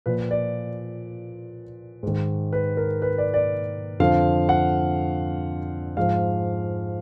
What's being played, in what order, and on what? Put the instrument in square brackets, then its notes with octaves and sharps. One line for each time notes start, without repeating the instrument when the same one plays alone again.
[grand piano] A#2 F3 B4
D5
G#2 D#3
B4
A#4
B4
D5
D5
F2 D3 F3 F5
F#5
G#2 F3 F5